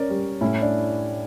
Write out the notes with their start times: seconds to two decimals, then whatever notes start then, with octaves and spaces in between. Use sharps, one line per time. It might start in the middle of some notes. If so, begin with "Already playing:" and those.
Already playing: C#4 A#4 D5
0.10 G3
0.41 A2 C#4 E4
0.62 D4